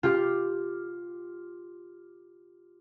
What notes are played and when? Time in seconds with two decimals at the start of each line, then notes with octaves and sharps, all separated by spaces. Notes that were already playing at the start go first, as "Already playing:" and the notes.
0.03 F4 G4